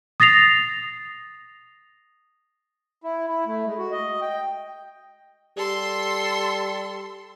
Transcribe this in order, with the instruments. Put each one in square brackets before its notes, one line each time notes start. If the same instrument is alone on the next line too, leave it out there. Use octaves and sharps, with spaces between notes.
[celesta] D#6 A6 A#6 C7 F7
[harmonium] E4
E4
A3
G#3
F#4
D#5
G5
[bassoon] G3 [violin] A4 C6